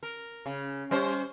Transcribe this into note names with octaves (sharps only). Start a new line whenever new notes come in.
A#4
C#3
G3 C#4 C5